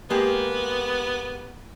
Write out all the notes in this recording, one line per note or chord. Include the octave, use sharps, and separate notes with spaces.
G#3 A#3 B3 G4